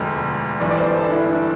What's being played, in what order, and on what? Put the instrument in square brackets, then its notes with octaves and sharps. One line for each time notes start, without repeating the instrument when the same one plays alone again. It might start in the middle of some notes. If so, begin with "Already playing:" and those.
Already playing: [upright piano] E1 D2 D3 F3
G1 G2 E3 D5
D5
C5
A4
D4
E4
D4